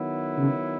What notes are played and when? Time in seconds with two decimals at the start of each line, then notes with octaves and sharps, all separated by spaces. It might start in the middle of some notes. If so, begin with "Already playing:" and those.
Already playing: D#3 F#3 B3 E4
0.38 C#3